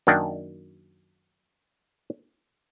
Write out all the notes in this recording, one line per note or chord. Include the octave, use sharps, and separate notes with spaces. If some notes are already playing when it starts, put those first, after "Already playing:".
F#2 D#3 A#3 D4 F#5 G5